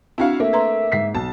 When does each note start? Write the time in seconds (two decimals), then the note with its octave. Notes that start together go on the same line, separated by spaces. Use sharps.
0.18 C4 D4 E4 F#4 F5
0.40 A3 A#3 E5
0.53 B4 A#5 C6
0.92 G#2 B6 C7
1.15 B1 A5